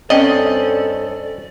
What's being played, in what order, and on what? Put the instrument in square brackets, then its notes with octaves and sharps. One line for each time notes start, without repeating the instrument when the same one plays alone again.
[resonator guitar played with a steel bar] G2 C4 C#4 [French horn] A4 [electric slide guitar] D5 [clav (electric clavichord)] D#5